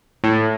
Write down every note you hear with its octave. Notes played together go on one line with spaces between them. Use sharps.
A2